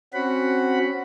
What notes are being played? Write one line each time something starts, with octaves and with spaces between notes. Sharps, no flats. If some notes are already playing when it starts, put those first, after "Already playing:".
C4 C#4 F#4 F#5 B5